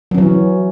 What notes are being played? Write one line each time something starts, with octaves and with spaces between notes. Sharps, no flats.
E3 F#3 C#4